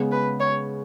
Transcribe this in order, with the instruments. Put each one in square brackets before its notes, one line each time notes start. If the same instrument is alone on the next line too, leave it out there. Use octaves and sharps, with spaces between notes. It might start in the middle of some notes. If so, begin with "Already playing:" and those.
Already playing: [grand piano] C#3 G#3 B3
[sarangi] B4
C#5